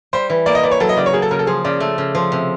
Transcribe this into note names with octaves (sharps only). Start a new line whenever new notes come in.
G3 C5
E3
A#3 D5
D#5
E3 D5
C#5
F#3 A4
D#5
C#3 D5
C#5
A#3 G#4
A4
C#3 A#4
A4
F3 G#4
C#3 D5
A3
C#3
F3
C3